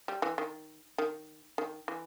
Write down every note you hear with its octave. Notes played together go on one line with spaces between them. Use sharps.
G3
E3
D#3
D#3
D#3
E3